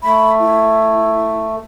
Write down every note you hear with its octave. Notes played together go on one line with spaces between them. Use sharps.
A3 B5
E4